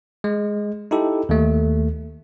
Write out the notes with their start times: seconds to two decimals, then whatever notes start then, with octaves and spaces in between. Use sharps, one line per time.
0.24 G#3
0.91 D#4 E4 G4 A4
1.29 D#2 A3